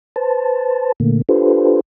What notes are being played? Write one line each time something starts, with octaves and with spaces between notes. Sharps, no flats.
B4 C5 A5
A#2 D3 A3 A#3
D4 F4 G4 A4 B4 C5